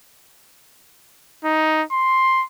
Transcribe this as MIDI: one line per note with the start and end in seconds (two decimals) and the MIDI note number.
1.45 1.83 63
1.92 2.44 84